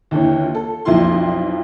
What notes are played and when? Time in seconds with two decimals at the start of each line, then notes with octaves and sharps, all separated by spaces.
0.11 D#2 D3 E3 C#5
0.42 F4
0.55 A4
0.85 B1 F2 E4 F4 C6